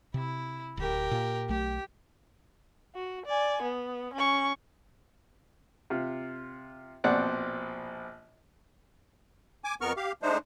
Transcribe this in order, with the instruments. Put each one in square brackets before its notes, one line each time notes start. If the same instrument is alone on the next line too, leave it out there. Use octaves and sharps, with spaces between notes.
[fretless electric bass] C3 [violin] E4
[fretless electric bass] D1 [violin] G4 A#4
[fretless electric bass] A#2
[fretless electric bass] B1 A3 [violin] G4
[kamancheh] F#4
D5 G#5
B3
C#4 C#6
[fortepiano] C3 F4
A#1 B2 C4 D5 F#5
[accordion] G#5 D6
F2 B3 A#4 C#6 F6
G4 F5
G#3 A3 D4 D#4 C5